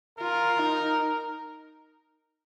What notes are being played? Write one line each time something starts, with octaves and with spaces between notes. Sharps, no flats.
F4 A#4
D#4